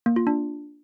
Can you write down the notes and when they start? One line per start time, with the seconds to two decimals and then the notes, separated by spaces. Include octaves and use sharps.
0.06 A#3
0.16 F4
0.27 D4